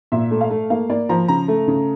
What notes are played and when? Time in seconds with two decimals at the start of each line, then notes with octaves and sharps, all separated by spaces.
0.12 A#2 E5
0.31 A3
0.41 F5
0.50 A3
0.70 A#3 F5
0.90 A#3 D5
1.09 F3 A#5
1.28 C#3 A#5
1.48 A3
1.68 C#3